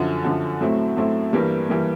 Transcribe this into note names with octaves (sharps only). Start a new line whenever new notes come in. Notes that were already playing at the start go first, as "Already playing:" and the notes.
Already playing: F#2 D3 F3
F#2 D3 F3
A2 F#3 A3 C4 E4
A2 F#3 A3 C4 E4
G2 E3 G3 A#3
E3 G3 A#3